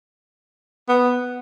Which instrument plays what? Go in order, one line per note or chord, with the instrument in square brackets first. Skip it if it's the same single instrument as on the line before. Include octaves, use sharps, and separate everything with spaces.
[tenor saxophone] B3